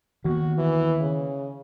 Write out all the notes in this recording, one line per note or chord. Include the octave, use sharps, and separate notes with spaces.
D#3 A#3 B3 F#4
E3
C#3